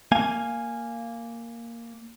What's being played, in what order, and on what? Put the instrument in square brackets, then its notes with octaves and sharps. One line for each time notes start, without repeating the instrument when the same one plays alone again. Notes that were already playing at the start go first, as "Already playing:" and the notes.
[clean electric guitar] A#3 F5 G#5